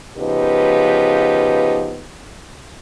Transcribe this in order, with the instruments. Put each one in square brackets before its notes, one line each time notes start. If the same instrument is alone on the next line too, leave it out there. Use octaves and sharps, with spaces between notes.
[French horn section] C#3 F3 B3 D#4 G4 B4